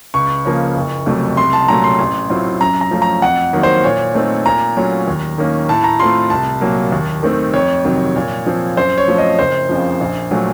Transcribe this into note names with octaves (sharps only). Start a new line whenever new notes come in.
C#2 C#6
C#3 F3 A#3 C#4
F#1
F2 C3 F#3 A3
C2 C6
A5
A#2 F#3 A3 C#4 A#5
C6
A1
A2 F#3 C4 F4
F#2 A#5
A#5
F3 A3 C#4
A#5
F2 F#5
D#3 F#3 A#3
C5
A#2 C#5
A3 C4 D#4
A#2 A#5
F#3 A3 C#4 F4
D#2
D#3 A#3 C#4
A2 A5
A#5
A3 C4 F4 C6
C2 A5
A#2 F#3 A#3
D#2
D#3 A3 C4
F2 C#5
C3 D#3 F#3
A#2
F3 C4
F#2 C5
C#5
F3 A3 C4
D#5
F#1 C5
F2 C#3 F3
A#1
A#2 F#3 A3